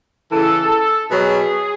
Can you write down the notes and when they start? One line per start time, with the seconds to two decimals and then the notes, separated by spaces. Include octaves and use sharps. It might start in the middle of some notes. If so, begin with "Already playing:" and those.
0.32 C#3 E3 A4
1.11 B2 F#3 G#4